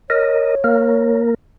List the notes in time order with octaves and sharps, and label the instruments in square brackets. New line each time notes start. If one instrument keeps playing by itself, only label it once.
[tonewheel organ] A#4 D#5 [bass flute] C#5
[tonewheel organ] A#3 A#4